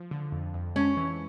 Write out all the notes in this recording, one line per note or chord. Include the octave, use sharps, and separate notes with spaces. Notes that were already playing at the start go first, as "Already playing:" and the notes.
Already playing: F3
D3
F2
F2
G#3 C#4
E3